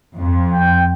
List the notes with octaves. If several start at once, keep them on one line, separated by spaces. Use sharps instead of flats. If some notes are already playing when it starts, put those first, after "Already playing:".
F2
G5